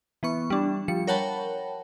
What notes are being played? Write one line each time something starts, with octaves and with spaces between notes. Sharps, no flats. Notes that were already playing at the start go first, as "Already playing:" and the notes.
E3 B3 C#6
G3 D4
F3 G3 C#7
A#4 C#5 F#5 G5 A5 B5